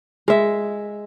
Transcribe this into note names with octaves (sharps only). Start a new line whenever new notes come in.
G#3 E5